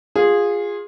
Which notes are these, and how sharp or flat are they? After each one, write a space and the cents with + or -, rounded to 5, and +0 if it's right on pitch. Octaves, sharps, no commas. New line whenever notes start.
F4 +15 G#4 -15